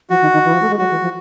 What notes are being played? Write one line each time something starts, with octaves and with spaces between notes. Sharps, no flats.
F3 F#4
D#3
D#3
E3
F3
A3
G#3
F#3 F#4
E3
F3